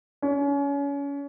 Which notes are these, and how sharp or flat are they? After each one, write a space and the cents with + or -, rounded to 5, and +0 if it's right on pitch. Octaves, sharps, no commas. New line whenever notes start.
C#4 +30